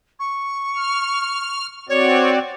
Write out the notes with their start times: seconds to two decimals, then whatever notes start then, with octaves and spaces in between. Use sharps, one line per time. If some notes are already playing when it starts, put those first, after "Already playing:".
0.19 C#6
0.76 F6
1.89 C4 F#4 C#5 D5